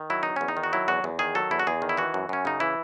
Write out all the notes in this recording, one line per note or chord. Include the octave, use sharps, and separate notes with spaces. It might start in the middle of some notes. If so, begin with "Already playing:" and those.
Already playing: D#3
F#3 E4
E2 D#4
E2 C#4
D#4
D#3
F#4
F#3 E4
E2 F#4
E2
D#3 G#4
F#3 A4
E2 E4
F#4
E2 G#4
D#3
E4
E3 F#4
F#2
F#2 C#4
C#3 D#4
E3 E4